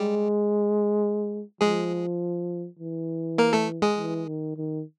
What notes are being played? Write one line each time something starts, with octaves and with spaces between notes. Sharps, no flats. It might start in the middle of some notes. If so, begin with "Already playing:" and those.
Already playing: G3 G#3 G4
F3 G#3 G#4
E3
A#3 A#4
A3 A4
G#3 G#4
E3
D#3
D#3